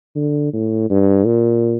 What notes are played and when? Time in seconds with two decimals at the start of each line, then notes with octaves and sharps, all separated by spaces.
0.16 D3
0.53 A2
0.90 G2
1.26 A#2